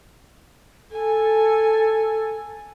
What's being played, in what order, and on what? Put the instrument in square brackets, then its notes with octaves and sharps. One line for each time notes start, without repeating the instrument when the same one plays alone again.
[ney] A4 [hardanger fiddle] G#5